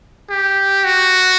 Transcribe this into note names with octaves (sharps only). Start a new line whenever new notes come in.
G4
F#4